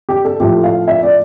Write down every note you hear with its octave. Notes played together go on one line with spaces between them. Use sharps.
G4
A4
A2 F3 A3 G4
F5
E5
D5